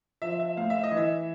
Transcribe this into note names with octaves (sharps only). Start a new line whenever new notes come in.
F3 E5
E5
A2 F5
E5
D#5
E3
E5